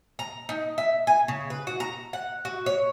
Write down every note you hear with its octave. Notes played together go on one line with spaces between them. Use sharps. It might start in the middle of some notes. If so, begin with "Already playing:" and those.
A#5
D#4
E5
G#5
C#3
B4
F#4
A#5
F#5
F#4
C#5